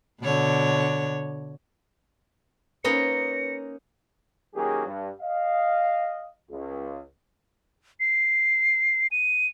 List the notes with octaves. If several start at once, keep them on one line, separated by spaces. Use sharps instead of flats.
B2 D3 C#5
A#3 C#4 D#4 B4 A#6 C#7
D#3 F#3 A#3 C#4 G4 G#4
G2
D#5 F5
C#2
C7
D#7